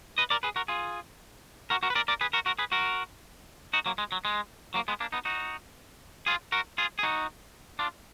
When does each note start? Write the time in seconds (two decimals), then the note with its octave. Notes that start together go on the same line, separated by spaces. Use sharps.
0.18 B4 D#5
0.30 A#4 D5
0.43 G#4 B4
0.56 F#4 A#4
0.68 F4 G#4
1.70 F#4 A#4
1.83 F#4 A#4
1.90 B4
1.95 A#4 D5
2.08 A#4 D5
2.21 G#4 B4
2.33 F#4 A#4
2.46 F#4 A#4
2.59 G#4 B4
2.72 F#4 A#4
3.73 D#4 F#4
3.86 F#3 A#3
3.98 G#3
4.12 F#3
4.25 G#3
4.74 F#3 A#3
4.88 G#3 B3
5.00 A#3 D4
5.12 B3 D#4
5.25 D#4 F#4
6.26 F4 G#4
6.52 F#4 A#4
6.78 F4 G#4
6.99 G#4
7.03 D#4 F#4
7.79 D4 F4